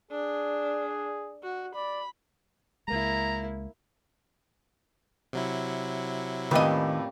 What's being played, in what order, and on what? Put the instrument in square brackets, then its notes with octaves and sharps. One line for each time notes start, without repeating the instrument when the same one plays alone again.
[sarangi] D4 [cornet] G#4
[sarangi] F#4
[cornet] D5 [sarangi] B5
[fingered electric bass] C#2 G#3 [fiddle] A#3 E4 [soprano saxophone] A#5
[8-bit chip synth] C3 F#3 E4
[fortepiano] F2 A2 B4 [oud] D#3 D#5 [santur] G3 A#3 C#4